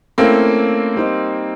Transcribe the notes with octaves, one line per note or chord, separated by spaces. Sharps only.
A3 A#3 C4 C#4 E4 A4
G3 C4 D#4